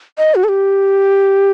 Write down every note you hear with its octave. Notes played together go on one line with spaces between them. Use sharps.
D#5
F#4
A4
G4